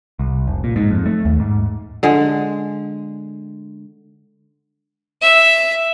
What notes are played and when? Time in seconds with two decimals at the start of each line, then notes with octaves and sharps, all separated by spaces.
0.19 C2
0.48 F1
0.64 A#2
0.76 G#2
0.91 F2
1.06 A3
1.25 D#2
1.40 G#2
2.03 D3 G#3
5.21 E5